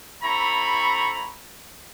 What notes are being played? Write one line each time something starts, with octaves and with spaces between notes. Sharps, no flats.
C4 E4 A4 A#5 B5 C#6